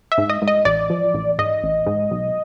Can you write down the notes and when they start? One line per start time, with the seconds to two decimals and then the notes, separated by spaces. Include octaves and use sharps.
0.12 E5
0.18 G#2
0.29 D#5
0.42 G#2
0.48 D#5
0.65 A1 D5
0.90 F3
1.14 A1
1.38 G#2 D#5
1.63 A1
1.86 G#2
2.11 B1